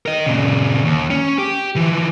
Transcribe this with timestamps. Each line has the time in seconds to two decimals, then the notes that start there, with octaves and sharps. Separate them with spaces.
0.06 A#4 D#5
0.27 A#2 C#3
0.85 D#2
1.10 C#4
1.38 G4
1.76 E3 F3